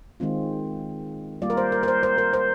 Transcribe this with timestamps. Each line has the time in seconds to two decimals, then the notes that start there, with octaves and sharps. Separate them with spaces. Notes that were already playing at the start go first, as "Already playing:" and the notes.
0.20 D#3 G#3 C4 F4
1.42 G3 A#3 F4 D5
1.50 A#4
1.57 C5
1.72 A#4
1.83 A#4
1.88 C5
2.03 C5
2.18 A#4
2.33 C5